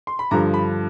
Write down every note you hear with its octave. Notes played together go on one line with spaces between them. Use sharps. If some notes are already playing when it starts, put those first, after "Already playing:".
C6
B5
G2 D3 F3 A#5
B5